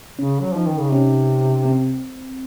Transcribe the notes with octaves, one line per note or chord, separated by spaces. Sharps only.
C#3 C#4
F#3
F3 D#4
D#3
C#3
C3 C#4
C4